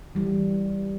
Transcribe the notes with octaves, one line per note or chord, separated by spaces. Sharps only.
E3 G3